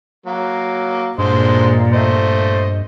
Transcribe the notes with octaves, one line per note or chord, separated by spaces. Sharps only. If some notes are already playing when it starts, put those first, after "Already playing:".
F#3 A#3
G2 A#2 D3 G#3 C5
A3 C5 D#5